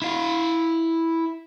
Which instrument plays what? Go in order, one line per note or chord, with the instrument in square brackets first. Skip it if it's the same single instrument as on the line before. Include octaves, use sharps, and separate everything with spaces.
[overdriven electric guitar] E4 F5